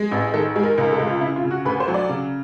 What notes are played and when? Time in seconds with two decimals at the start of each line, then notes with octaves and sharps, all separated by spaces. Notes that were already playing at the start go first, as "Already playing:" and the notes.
Already playing: G#3
0.11 A1
0.33 D#3 A4
0.56 G#3
0.63 A#4
0.78 C#2 A#4
0.92 A4
0.99 C#2
1.07 F4
1.21 C#3 E4
1.36 F4
1.44 C#3
1.51 F#4
1.65 D2 B4
1.80 C5
1.88 F#3
1.94 D5
2.09 C#3